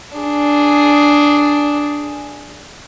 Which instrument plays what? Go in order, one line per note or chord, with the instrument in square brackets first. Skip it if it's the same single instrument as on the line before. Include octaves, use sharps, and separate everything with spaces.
[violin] D4 G#4